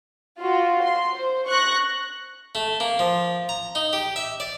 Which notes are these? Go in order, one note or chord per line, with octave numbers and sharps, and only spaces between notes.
F4 F#4
C6
C5
C#6 F#6 A#6
A3
A#3
F3
A#5
D#4
G4
E5
D5